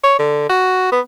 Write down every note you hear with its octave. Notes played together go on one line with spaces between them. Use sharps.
C#5
D3
F#4
B3